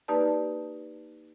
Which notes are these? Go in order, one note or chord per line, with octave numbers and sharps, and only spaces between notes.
A#3 D#4 G4 B4 D5 A5